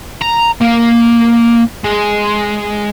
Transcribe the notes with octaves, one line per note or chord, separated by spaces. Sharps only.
A#5
A#3
G#3